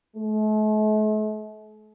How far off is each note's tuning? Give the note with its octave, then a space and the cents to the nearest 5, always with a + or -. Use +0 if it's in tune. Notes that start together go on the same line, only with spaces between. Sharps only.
A3 -45